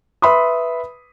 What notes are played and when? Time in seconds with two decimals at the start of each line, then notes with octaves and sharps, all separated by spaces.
0.22 B4 E5 B5 C6 D#6